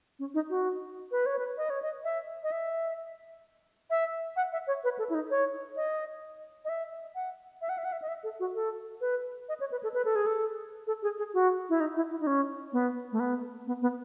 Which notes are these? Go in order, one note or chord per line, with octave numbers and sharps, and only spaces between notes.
C#4
D#4
F#4
B4
C#5
B4
D#5
C#5
D#5
E5
D#5
E5
E5
F#5
E5
C#5
B4
A4
E4
D#4
C#5
D#5
D#5
E5
F#5
E5
F#5
E5
F#5
E5
D#5
E5
A4
F#4
A4
B4
D#5
C#5
B4
A4
B4
A4
G#4
A4
A4
G#4
G#4
F#4
E4
D#4
E4
E4
D#4
C#4
B3
A3
B3
B3
B3